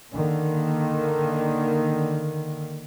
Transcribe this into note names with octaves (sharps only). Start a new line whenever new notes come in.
D3 D#3 A#3